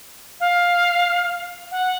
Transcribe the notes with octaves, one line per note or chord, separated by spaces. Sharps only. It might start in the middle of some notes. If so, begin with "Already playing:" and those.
F5
F#5